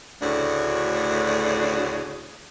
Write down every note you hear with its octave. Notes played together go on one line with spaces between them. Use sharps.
D2 A2 C#3 D4 F#4